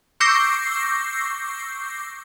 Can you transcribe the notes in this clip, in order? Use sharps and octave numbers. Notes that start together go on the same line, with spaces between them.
C#6 D6 E6 G6 A#6 C7